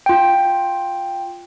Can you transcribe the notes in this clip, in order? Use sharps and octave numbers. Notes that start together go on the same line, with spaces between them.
F4 G5